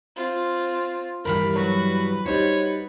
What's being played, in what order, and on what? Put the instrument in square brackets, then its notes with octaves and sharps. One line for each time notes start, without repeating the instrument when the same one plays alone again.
[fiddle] C4 F4
[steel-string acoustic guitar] G2 E3 G3 [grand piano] A#4 F6 [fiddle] B5
[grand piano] F#3 [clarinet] F#4 [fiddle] B4
[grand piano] G3 D#4 C5 [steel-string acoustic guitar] F#4 [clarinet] C#5